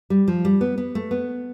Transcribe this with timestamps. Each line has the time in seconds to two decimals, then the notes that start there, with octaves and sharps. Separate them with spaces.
0.10 G3
0.28 F3
0.45 G3
0.61 B3
0.78 B3
0.95 A3
1.11 B3